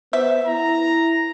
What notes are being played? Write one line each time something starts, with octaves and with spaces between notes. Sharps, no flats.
B3 C5 E5
E4 A#5